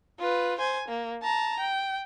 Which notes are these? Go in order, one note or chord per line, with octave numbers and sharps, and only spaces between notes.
F4 B4
C5 G#5
A#3
A5 A#5
G5